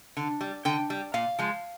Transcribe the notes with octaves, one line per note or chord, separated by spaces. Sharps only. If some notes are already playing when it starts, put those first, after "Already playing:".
D3
G3
D3 G5
G3
A#2 F5
F3 G#3